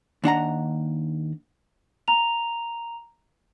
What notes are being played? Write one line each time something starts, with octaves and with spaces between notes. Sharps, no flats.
D#2 D4 F#5 A#5
A#5 F7